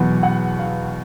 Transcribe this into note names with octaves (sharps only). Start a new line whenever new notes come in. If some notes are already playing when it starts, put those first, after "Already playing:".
Already playing: E2 B2 F#3 B3
F#5
F5